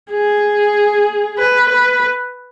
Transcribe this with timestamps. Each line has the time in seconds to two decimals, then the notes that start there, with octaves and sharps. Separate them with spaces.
0.11 G#4
1.38 B4
1.69 B4